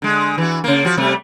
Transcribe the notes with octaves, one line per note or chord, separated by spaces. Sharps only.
D3 G#3
E3 F#4
C#3 A#3
F3 F#4
C3 G3 A3